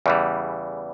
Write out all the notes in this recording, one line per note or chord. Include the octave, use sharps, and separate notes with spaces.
E2 C#3 E3 G3